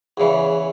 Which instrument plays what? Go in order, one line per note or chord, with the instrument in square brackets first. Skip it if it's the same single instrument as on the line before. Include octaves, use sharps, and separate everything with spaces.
[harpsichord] E2 C#3 E3